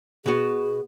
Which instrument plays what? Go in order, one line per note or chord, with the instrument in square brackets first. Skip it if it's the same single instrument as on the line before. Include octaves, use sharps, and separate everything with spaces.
[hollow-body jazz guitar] B2 B3 F#4 [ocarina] G#4